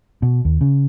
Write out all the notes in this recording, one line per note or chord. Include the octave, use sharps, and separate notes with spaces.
B2
D#2
C#3